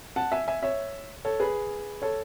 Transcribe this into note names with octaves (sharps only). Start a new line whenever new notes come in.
F#5 A5
E5 G#5
E5 G#5
C#5 E5
A4 C#5
G#4 B4
A4 C#5